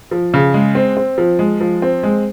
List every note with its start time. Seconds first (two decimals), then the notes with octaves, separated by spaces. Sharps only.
0.11 F3
0.34 C#3
0.54 G#3
0.75 C4
0.97 C4
1.18 F3
1.39 G#3
1.61 F3
1.82 C4
2.03 G#3